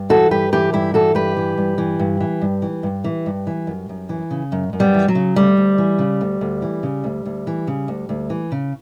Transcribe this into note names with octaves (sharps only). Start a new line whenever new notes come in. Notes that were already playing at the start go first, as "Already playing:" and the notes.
Already playing: G2
E3 F#4 A4
G2 G4 B4
E3 G4 B4
G2 E4 G4
E3 F#4 A4
G2 G4 B4
E3
G2
E3
G2
E3
G2
E3
G2
E3
G2
E3
F#2
F#2
E3
C#3
F#2
F#2
G3 B3
E3
F#3
C#3
D2 G3
D2
E3
C#3
D2
D2
E3
C#3
D2
D2
E3
C#3
D2
D2
E3
C#3